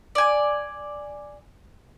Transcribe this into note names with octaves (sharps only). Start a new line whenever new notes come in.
D5 G#5